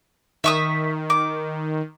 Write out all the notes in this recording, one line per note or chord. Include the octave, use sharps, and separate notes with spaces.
D#3 E5 C#6 D#6
D6